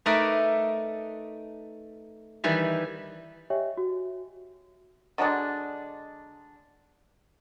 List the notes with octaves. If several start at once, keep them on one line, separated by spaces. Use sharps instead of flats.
A3 D#4 A#4 B4 D5 E5
D#3 E3 G3 E5
G4 C#5 D#5 E5 G5 G#5
F#4
D3 F#3 G#3 D4